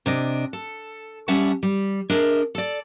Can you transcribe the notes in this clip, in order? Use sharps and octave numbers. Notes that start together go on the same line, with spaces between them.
C3 D4 D#5
A4
G3 C#4 E5 F#5 A5
G3
D4 G#4 A#4 D#5 E5
A4 D5